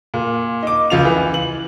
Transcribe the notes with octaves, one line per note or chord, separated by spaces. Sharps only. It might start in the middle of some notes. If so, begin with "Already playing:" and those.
A#2
D#4 D6
C#2 F4 F7
E3
F#7